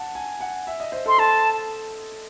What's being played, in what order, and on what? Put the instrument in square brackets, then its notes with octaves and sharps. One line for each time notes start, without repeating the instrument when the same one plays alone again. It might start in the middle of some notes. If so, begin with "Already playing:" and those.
Already playing: [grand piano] F#5 A5
G#5
F#5
E5
D#5
C5
[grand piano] A4 [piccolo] C6
[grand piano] A4 [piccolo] A5